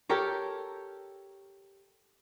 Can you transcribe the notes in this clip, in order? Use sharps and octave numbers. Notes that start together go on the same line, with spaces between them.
G4 A4 A#4 C#5